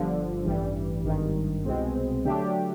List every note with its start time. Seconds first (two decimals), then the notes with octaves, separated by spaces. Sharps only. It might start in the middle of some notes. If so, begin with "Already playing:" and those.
Already playing: G1 G2 D3 F3
0.45 A1 G2 E3 G3
1.05 G#1 G2 D#3
1.65 C2 B2 G#3 C4
2.25 D3 F#3 A3 D4 G4